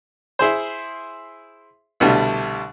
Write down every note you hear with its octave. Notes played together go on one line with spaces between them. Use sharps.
E4 G#4 C5
C2 B2 D3 G3 A3